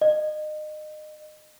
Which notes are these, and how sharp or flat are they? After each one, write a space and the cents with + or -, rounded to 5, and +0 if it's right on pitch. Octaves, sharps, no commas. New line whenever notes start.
D#5 -30